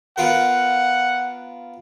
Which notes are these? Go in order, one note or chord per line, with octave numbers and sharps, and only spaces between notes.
B3 F4 A#4 F#5